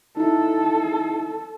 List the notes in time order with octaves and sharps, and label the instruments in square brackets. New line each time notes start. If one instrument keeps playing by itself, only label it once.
[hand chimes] D#4 E4 [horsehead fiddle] A4